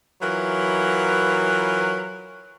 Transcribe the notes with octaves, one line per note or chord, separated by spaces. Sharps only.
E3 F#3 F4 A#4 B4